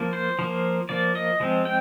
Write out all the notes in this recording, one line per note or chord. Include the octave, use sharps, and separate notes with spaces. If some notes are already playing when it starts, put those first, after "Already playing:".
Already playing: F3 A#3
C5
F3 A#3
F3 A#3 D5
D#5
F3 G#3 C4
G5